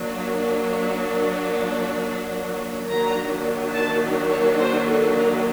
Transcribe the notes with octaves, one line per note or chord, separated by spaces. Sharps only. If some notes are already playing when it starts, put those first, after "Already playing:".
Already playing: F#3 A#3 D4
D#3 F#3 A#3 D4 A#5
A5
C#5
C5
A4
A#4